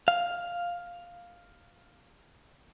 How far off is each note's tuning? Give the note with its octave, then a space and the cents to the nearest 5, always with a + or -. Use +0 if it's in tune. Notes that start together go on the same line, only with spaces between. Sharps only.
F5 +5